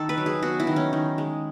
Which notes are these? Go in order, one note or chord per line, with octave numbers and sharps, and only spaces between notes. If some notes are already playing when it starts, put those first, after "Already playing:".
Already playing: D#3 A4
B4
F#3
G#4
B3 F#4
E4
D#3
C#4
D#3
G#3